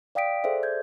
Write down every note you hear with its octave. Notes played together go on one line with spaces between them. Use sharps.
D5 F5 G5 D#6 B6 D7
G#4 A4 C5 D5 E5
G6 G#6